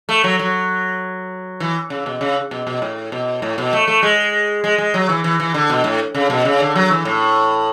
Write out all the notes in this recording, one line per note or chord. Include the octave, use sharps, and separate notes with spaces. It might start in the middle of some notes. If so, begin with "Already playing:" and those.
A3
F#3
F#3
E3
C#3
B2
C#3
B2
B2
A2
B2
A2
B2
A3
A3
G#3
G#3
G#3
F#3
E3
E3
E3
D3
B2
A2
C#3
B2
C#3
D3
F#3
E3
A2